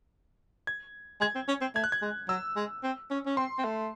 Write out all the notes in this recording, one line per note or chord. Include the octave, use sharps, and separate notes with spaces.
G#6
G#3 G#6
C4
C#4
C4
A3 G#6
F#6
G#6
G#3
F#3 E6
G#3
C4
C#4
C#4
C4 C6
C4
A3